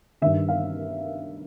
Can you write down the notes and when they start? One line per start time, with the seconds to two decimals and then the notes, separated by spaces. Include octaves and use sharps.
0.21 D#3 E5
0.26 G2
0.48 F5